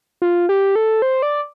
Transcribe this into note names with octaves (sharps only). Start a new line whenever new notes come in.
F4
G4
A4
C5
D5